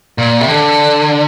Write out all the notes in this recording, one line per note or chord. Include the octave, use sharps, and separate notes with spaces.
A#2
C3
D3